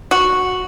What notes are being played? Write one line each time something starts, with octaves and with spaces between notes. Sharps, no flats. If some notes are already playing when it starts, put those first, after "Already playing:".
F#4